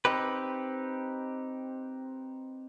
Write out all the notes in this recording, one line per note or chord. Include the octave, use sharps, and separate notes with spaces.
C4 D#4 G4 B4